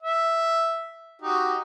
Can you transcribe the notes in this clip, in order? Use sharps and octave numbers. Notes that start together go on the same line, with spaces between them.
E5
D#4 F#4 G4